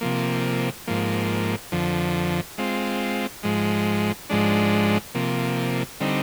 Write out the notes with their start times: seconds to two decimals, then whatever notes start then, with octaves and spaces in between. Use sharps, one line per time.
0.01 C3 F3 A#3
0.87 G#2 F3 A#3
1.72 F2 D3 F3
2.58 G#3 C4 F4
3.43 G#2 F3 G#3
4.30 G#2 F3 G#3 D4
5.15 C3 F3 A#3
6.00 D3 G3 C4 D#4